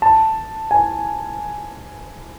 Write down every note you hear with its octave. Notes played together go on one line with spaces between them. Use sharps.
A5
G#5